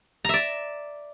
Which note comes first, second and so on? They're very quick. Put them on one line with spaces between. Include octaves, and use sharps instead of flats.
A#5 E5 D5